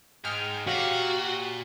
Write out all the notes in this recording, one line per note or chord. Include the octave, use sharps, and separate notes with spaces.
G#2 G#3 G#4 G5 F6
A#2 F#4 G4 C#5 F5